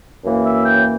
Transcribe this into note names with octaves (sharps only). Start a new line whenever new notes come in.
F#2 E3 A#3
E5
G5